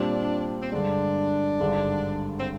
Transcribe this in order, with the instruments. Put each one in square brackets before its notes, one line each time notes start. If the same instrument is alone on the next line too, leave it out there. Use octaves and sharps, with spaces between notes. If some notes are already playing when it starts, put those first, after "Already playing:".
Already playing: [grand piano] A#2 G3 C4 [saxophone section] D4
[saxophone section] C4
[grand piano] G2 D3 G#3 [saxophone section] D4
[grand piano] G#1 G2 D3 G#3
[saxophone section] C4